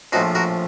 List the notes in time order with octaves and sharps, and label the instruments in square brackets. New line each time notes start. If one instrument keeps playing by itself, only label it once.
[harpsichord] A#1 A2 F3 D#4 F#4
F#4 A#4